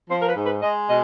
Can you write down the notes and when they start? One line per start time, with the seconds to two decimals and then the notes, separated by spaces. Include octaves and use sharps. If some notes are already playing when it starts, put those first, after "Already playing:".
0.10 F3 C5
0.21 A#4
0.28 B4
0.36 G#2
0.45 B4
0.62 G#3 D#5
0.88 B2 D#5